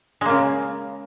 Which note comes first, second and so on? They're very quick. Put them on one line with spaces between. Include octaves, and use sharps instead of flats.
G#3 A#3 C#3